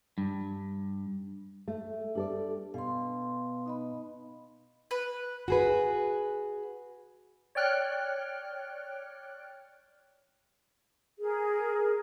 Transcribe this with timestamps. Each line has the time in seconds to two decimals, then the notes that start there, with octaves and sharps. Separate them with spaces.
0.18 G2
1.68 A3
2.15 G3 D4 A4 D5
2.74 B2 F5 C6
3.66 D#4 D#5 B5
4.91 B4
5.48 F#4 G#4 B4
7.55 C#5 D5 G5 F6 F#6
11.19 G#4 A#4